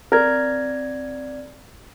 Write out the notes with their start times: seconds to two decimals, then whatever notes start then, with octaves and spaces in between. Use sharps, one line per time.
0.12 C4 A#4 D5 G#6